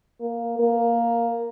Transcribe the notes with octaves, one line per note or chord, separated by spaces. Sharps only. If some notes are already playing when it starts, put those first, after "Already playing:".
A#3
A#3